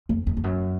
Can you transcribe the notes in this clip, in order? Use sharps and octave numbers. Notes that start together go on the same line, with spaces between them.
F2
F2
F2
F#2